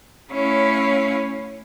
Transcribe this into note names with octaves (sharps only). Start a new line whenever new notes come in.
A3 C#4 E4 C#5 F5